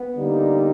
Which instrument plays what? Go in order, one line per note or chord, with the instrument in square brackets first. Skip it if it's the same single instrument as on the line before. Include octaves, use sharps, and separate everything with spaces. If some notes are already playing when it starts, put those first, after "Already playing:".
Already playing: [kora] B3
[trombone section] D3 G3 A#3 D#4